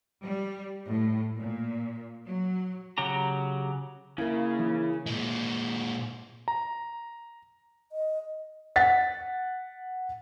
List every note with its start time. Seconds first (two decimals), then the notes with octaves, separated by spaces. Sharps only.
0.23 G3
0.87 A2
1.38 A#2
2.25 F#3
2.98 C#3 F#3 G4 A#5
4.18 C#3 A#3 E4 A#4
4.59 E3
5.06 A#2 G#3
6.48 A#5
7.92 D#5
8.76 F#5 A6 B6